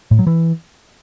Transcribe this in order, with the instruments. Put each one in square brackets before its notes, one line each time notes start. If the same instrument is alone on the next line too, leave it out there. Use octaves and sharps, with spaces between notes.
[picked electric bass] A2
F#3
E3